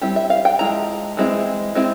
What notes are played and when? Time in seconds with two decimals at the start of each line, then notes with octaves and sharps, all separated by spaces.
0.01 G3 C4 E4 G4
0.16 E5
0.30 F5
0.45 G5
0.59 F3 G#3 E4 A#5
1.17 E3 G#3 C4 E4
1.75 G#3 C4 E4